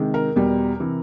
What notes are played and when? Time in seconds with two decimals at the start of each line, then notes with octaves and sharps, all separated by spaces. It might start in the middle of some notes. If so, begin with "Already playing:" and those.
Already playing: C3 D#3 G#3
0.14 A#4
0.36 E2 B2 G3
0.80 C3 E3